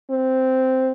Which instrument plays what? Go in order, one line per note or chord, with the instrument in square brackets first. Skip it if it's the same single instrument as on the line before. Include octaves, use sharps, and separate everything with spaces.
[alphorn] C4